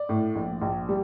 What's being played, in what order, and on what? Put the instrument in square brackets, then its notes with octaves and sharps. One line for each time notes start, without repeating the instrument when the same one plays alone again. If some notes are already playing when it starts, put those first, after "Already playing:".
Already playing: [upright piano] D5
A2
A#1
A#1
G3